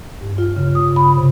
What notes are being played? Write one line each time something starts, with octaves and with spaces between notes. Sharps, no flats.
G2
F4
C#3
D#6
B5
C3